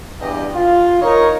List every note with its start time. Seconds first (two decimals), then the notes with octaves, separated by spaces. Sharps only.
0.20 E2 G2 G4 D#5
0.55 F4
1.02 D#4 A#4 C#5 D#5